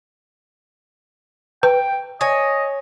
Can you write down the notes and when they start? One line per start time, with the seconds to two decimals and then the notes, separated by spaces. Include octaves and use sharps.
1.63 B4 G5
2.21 C#5 D#5 G#5